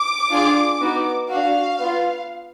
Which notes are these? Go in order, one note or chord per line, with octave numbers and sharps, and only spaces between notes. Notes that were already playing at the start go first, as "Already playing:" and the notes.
Already playing: D6
D4 F4 G#4
B3 D#4 F#4
D4 F#4 F5
B3 F4